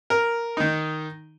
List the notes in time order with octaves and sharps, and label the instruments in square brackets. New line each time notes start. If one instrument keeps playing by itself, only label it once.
[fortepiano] A#4
D#3 D#4